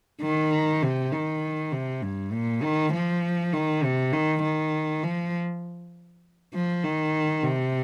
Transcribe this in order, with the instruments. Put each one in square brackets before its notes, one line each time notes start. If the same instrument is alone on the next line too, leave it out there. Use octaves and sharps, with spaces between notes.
[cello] D#3
C3
D#3
C3
G2
A#2
D#3
F3
D#3
C3
D#3
D#3
F3
F3
D#3
C3